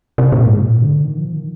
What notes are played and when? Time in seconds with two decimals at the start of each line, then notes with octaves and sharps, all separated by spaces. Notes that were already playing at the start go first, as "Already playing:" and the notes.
0.18 C3
0.32 A#2
0.46 G#2
0.61 A#2
0.82 D3
1.04 D#3
1.18 F3
1.33 D#3